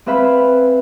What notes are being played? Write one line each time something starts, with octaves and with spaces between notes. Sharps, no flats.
C4 G#4 B4 E5 F5 B5